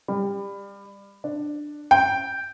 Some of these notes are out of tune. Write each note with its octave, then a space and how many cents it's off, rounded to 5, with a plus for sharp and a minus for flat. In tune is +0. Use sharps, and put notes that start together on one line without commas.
G3 +25
D4 +10
G5 -5